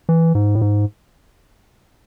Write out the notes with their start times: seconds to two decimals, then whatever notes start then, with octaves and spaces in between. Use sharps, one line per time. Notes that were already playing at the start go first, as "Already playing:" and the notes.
0.09 E3
0.35 G#2
0.55 A2
0.61 G#2